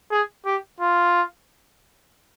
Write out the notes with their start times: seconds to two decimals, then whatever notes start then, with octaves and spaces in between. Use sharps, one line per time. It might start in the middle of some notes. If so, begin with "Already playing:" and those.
0.11 G#4
0.46 G4
0.80 F4